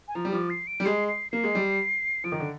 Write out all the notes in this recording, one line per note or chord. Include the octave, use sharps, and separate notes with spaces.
G#5
F3 A#5
G3
F3 D6
C7
D7
G3
G#3 C7
C7
A#3 C7
G#3
G3
F3 D7
D#3
D3